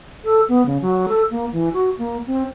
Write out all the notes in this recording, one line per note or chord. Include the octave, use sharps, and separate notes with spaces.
A4
B3
C#3
F#3
A4
A#3
E3
F#4
A#3
C4